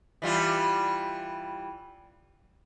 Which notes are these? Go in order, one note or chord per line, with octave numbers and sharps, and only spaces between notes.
E3 G3 F4